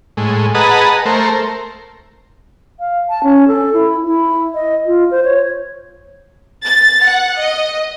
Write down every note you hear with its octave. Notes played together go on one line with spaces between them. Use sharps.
A2 G#3
G#4 B4 D#5 F#5 A5 A#5
A3 A#4 C5
F5
A5
C#4
A4
E4
E4
D#5
F4
C5
C#5
A6
F#5
D#5